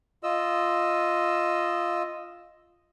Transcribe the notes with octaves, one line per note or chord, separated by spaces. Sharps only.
F4 D#5 E6